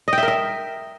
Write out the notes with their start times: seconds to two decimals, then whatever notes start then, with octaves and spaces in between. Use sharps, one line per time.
0.08 D#5
0.13 G5
0.18 E5
0.23 A#4
0.28 E5